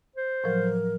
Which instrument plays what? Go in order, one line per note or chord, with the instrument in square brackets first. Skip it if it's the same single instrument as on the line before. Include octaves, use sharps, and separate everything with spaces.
[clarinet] C5
[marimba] A2 F3 F#3 [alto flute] A#4